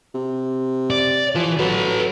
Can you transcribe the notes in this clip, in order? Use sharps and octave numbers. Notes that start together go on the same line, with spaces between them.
C3
D5
E3 F3
F#3 A4 B4